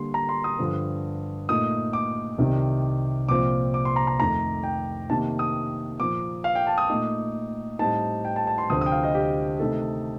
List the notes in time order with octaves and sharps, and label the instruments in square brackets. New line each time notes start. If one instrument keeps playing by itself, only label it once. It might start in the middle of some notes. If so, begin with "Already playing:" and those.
Already playing: [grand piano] D3 G3 A#3 C6
A#5
C6
D#6
G2 D3 F3
A#2 A3 D#4 D#6
D6
C2 C3 D#3
C2 A#2 F3 C4 F4 D6
D6
C6
A#5
A#5
F2 D#3 A3 A#5
G5
C3 D#3 A#3 A5
D#6
A#2 F3 A#3 D6
F5
G5
A5
D#6
A#2 A3 D#4
A2 G3 C4 D#4 A5
G5
A5
A5
C6
D2 C3 F3 C4 D#6
D#6
G5
F5
D#5
G4
C3 D#3 A3 D#4 A4